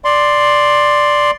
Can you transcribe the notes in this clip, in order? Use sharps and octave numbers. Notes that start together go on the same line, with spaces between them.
D5 C6